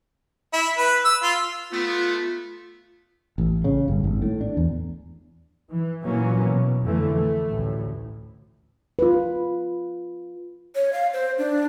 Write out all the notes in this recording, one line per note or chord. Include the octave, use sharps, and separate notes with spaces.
E4
B4
E6
F4
A3 B3 F4
A1
C#3
G1
G#1
A2
D4
E2
E3
A#2 E3 F#3 A#3 C#4
B2
F2 D3 E3 A3
A3
A1 D2 A2
F4 B4
C#5
F5
C5
D4